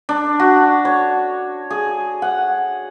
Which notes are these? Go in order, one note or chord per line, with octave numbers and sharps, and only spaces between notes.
D4
F#4
C#5
G#4
F#5